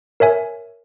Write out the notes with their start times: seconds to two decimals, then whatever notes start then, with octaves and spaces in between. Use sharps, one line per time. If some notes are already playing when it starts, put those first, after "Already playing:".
0.20 A#4 C#5 E5 G#5